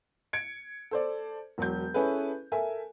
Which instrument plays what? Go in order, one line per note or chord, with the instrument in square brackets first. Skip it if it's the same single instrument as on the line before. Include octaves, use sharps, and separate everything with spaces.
[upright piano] G#6 C#7 D7
A4 C5 D5
E1 F#3 G6
C#4 E4 G#4 A4 B4
A4 A#4 E5 G#5